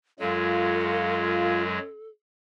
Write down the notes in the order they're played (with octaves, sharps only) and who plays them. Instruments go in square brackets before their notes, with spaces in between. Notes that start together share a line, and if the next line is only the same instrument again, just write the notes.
[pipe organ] F#2 F#3 G#3 [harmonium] F4 [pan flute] A4